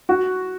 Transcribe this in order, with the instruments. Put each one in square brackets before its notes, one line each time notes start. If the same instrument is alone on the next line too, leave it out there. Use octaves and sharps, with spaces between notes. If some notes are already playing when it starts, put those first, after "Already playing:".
[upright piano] F#4